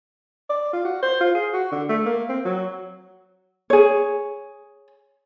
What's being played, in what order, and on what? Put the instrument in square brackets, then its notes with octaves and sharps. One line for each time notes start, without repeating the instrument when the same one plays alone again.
[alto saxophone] D5
F4
F#4
C5
F4
G#4
F#4
D3
A3
A#3
C4
F#3
[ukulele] G#4 C#5